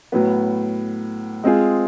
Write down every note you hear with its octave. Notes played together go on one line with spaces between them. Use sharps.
A2 F#3 B3
G#3 C4 F4 G#4